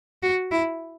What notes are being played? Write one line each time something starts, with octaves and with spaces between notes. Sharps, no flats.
F#4
E4